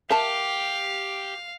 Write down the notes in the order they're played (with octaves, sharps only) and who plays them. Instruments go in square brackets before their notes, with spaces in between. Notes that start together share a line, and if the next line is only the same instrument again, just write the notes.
[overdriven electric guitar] G4 [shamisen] A#4 E5 A5 [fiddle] F5